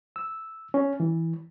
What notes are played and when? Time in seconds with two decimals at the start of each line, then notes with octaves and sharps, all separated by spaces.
0.16 E6
0.74 C#4
1.00 E3